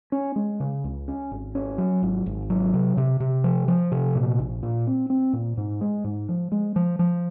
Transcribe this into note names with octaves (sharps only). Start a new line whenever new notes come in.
C#4
G#3
C#3
C#2
C#4
G#1
C#4
F#3
G#1
G#1
F#3
C3
C3
C3
F3
F3
C3
A#2
A#1
A#2
C4
C4
A#2
G#2
G#3
G#2
F3
G#3
F3
F3